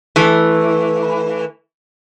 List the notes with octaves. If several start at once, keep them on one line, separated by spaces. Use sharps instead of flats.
E3 A3